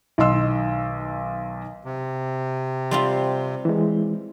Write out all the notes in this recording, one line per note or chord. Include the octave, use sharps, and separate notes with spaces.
B1 D#3 D#5 C6 E6
C3
G3 C4 F4 C6
E3 G#3